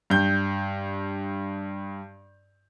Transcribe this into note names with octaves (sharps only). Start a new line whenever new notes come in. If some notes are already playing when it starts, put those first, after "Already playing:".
G2 G6